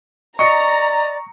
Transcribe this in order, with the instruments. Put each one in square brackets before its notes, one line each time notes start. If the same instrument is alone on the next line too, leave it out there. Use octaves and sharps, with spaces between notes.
[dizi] D5 [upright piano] D#5 C#7 [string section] A#5 [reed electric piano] C#6